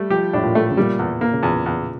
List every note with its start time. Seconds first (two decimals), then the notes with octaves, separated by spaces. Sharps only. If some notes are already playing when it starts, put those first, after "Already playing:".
Already playing: G3 A3
0.10 F3 G4
0.33 A2 D4
0.44 A#2
0.55 A3
0.70 C#3
0.77 A#2 G3
0.99 E2
1.21 A#3
1.33 C#3
1.43 E2 A#2
1.66 E2